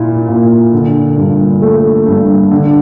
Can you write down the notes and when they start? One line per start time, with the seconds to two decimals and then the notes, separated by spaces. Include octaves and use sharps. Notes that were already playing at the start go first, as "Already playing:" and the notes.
Already playing: A#2 E4
0.28 A#2
0.73 D3
1.17 G2
1.62 A3
2.06 G2
2.51 D3